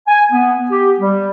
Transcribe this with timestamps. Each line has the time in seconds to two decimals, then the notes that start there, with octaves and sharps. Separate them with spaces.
0.08 G#5
0.32 B3
0.71 G4
1.00 G3